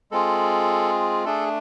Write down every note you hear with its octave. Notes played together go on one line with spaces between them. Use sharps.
G#3 C4 F4 G#4 A4
A3 D4 G#4 A4